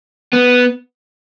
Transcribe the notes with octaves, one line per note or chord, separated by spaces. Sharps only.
B3